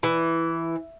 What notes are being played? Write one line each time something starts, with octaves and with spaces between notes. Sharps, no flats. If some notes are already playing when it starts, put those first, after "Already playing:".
E3